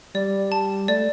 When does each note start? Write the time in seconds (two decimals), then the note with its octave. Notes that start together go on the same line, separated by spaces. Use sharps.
0.14 G3 D5
0.52 A5
0.88 A3 D5